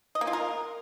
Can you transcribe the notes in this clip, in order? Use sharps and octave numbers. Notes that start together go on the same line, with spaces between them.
D#5
A#3
F4
A#4